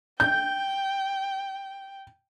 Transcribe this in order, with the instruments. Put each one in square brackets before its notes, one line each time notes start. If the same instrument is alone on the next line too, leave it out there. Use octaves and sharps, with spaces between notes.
[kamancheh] G5 [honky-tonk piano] G6